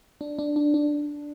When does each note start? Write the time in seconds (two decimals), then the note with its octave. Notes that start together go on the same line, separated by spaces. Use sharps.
0.21 D4
0.39 D4
0.56 D4
0.74 D4